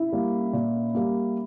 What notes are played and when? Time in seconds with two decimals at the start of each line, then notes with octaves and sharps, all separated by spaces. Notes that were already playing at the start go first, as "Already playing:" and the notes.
Already playing: E4
0.12 G3 A#3
0.53 A#2
0.95 G3 A#3